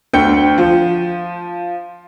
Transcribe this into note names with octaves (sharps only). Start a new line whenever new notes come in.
D2 D3 G5 G6 C#7
F3